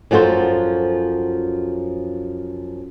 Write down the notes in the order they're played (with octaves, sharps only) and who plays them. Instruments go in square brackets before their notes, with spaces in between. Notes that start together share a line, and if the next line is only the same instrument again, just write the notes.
[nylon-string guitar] F#2 F3 F#4 A4 C5